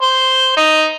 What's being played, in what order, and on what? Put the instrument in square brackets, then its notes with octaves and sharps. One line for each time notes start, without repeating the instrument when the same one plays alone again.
[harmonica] C5
D#4